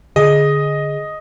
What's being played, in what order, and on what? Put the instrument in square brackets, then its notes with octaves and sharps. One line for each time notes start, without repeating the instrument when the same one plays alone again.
[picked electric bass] D3 [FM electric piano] G#4 [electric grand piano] D#5